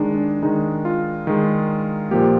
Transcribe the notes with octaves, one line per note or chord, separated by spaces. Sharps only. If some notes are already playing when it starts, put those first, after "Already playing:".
Already playing: D#3 G#3 D4 D#4
D4
D#3 G#3 D#4
F4
D#3 G#3
A#2 F3 A#3 G4